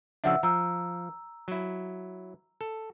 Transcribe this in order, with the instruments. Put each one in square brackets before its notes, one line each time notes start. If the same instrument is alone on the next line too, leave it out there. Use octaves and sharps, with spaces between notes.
[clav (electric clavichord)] C#3 F3 D4 [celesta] E5 F#5 E6
[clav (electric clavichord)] F3 [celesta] A#5 E6
[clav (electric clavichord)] F#3 E4
A4